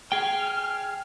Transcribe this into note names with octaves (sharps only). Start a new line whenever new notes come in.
G#4 G5 F6